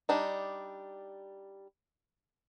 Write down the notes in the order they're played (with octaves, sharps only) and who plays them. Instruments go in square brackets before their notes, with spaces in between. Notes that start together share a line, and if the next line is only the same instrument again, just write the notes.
[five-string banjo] G3 D4 D#4